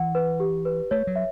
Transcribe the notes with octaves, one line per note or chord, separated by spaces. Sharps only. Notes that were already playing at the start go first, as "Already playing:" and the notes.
Already playing: E3 F#5
B4
G4
B4
A3 C#5
F#3
E5